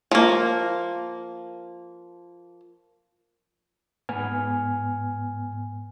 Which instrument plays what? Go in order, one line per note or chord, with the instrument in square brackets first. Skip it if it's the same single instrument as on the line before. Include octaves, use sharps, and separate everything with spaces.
[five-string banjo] F3 A#3
[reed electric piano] G#2 B3 G#5 F6